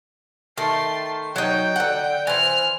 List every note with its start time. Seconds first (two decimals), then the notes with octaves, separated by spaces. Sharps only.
0.57 D#3 A3 A5 C6
1.36 F#3 D#4 G5
1.76 D3 F#5
2.27 E3 C5 F6